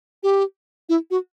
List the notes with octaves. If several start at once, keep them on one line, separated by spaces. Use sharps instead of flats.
G4
E4
F#4